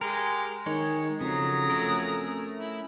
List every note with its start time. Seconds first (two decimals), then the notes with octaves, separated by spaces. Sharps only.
0.01 G#3 G4 A#4
0.66 D#3 G#3 G#4 C#5
1.21 F2 C#3 F#3 A#5 D#6
1.70 A3 C#4 A#4
2.59 E4